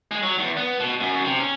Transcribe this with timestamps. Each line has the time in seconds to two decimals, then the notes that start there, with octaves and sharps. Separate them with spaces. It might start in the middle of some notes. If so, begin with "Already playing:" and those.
0.11 G#3
0.23 F#3
0.39 E2
0.57 B3
0.80 B2
1.00 F#2
1.25 C3
1.40 C#4